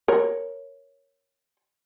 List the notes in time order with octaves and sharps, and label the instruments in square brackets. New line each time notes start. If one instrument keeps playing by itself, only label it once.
[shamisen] A#4 C#5